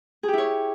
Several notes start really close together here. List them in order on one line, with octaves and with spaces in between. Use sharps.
G#4 G4 E4 C#5